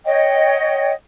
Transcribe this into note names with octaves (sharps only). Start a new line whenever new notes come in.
C#5 D#5 F#5 G5